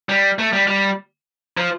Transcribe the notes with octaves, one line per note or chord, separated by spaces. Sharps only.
G3
A3
G3
G3
F3